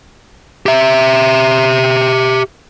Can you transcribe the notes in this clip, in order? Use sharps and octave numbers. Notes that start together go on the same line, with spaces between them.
G4 E5